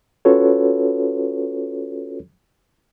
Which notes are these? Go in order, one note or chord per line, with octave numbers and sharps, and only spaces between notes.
C#4 F4 F#4 A4 B4 C#5